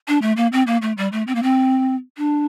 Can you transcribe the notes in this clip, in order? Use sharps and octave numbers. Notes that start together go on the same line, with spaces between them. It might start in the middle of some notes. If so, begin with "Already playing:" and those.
D4
A3
A#3
C4
A#3
A3
G3
A3
C4
A#3
C4
D4